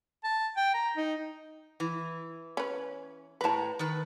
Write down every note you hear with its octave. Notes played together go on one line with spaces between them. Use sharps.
A5
G5
A#5
D#4
E3
C#4 B4
A2 B4 A5 A#5
D#3 B4